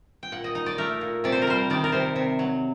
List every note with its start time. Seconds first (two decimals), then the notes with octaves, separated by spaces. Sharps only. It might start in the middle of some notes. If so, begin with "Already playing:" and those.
0.23 G5
0.32 A#2 F#5
0.44 D#5
0.55 D#4 D#5
0.66 D5
0.78 A3 A#4
1.01 A#2
1.24 C3 D5
1.32 C5
1.42 A#4
1.47 G3 C5
1.70 D#3 D5
1.84 A#4
1.92 C3 C5
2.16 C3
2.39 F#3